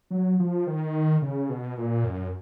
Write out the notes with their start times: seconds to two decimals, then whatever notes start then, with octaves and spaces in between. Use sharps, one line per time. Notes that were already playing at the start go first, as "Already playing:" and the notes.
0.11 F#3
0.39 F3
0.67 D#3
1.22 C#3
1.49 B2
1.78 A#2
2.05 F#2